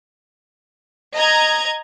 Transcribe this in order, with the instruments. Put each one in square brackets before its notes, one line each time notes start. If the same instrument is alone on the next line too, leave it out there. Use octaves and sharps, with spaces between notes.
[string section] D#5 A#5 G#6